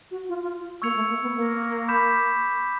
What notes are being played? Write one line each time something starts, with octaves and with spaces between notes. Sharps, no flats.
F#4
F4
F4
A#3 C#6 E6 G#6 C#7 F7
A3
A#3
B3
A#3
B5 D6 G6 B6 E7